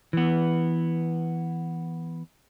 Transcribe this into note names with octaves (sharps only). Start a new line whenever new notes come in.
E3 B3